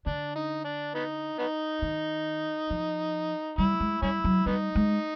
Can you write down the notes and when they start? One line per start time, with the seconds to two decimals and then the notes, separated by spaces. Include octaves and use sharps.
0.06 D3 D4
0.36 D#4
0.64 D4
0.95 B3 D#4
1.39 B3 D#4
1.82 D#3
2.70 F3
3.58 G3 E4
3.80 G#3
4.02 G3 C#4 E4
4.24 F#3
4.46 G3 B3 D#4
4.75 G#3